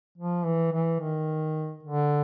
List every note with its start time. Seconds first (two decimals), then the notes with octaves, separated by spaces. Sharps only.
0.18 F3
0.45 E3
0.72 E3
1.00 D#3
1.83 D3